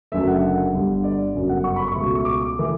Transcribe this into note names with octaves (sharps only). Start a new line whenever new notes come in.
F#1 F#2 D3 A3 E5
F#5
F#5
G1 G2 D3
D5
G1 F#2 C#3
F#5
C#6
B5
C#6
C#2 B2 A3
C#6
D6
D6
E3 A3 D6